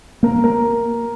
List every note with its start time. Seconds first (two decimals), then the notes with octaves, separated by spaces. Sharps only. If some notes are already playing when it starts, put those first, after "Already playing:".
0.23 A#3 A#4
0.44 A#4